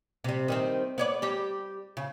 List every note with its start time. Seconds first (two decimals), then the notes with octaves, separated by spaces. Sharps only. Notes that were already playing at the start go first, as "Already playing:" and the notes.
0.24 C3 G3
0.48 D#3 G3 C4
0.98 B3 C#5 D5
1.22 G3 G4
1.97 C#3